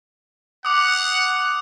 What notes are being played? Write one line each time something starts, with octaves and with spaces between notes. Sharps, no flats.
F#5 D6 D#6